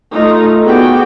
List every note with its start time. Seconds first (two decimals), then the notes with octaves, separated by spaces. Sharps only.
0.12 A3 D#4 F4
0.64 B3 F#4 G#4 D5 G5